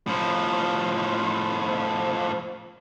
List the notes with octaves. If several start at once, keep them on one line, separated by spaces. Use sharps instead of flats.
A2 F3